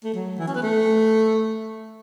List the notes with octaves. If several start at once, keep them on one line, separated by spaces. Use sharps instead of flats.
A3
F#3
E3
C#4
B3
A3